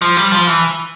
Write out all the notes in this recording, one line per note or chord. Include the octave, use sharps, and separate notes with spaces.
F3
G3
F3
E3